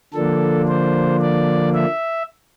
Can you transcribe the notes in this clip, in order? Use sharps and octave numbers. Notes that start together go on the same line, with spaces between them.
D3 F3 A#3 D4 A4
C5
D5
E5